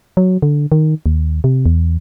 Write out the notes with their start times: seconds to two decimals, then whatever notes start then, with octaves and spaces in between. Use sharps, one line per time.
0.17 F#3
0.42 D3
0.72 D#3
1.06 D#2
1.44 C3
1.66 E2